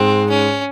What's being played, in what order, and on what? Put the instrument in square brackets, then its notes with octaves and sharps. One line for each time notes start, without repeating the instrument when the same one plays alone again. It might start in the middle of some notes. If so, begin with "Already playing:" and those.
Already playing: [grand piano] G#2 G#3 [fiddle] C4
[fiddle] C#4